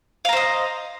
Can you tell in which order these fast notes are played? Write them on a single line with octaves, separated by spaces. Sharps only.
F5 A#5 C5 D#5